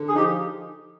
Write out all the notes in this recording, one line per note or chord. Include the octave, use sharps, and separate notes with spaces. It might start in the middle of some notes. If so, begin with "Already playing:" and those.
Already playing: D3
G#4
F3 D#4 G4